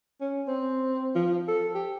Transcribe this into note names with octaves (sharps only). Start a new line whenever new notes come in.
C#4
C4
F3
A4
G4